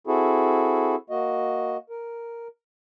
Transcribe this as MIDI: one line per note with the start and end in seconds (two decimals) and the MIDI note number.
0.07 0.95 60
0.07 0.95 64
0.07 0.95 66
0.07 0.95 68
0.07 0.95 69
1.10 1.77 58
1.10 1.77 66
1.10 1.77 75
1.90 2.48 70